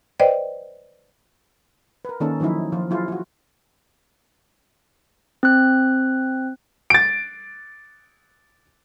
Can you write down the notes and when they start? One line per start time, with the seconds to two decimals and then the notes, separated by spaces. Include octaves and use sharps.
0.20 B4 C5 D5 D#5 G5
2.05 A#4 B4
2.20 D#3 A#3 C#4 D#4 A4
2.40 D#3 F3 F#3 D#4 E4
2.72 F3 F4
2.90 F#3 E4 F4 G#4
3.08 F4 F#4
5.43 C4 F#6
6.90 A6 D7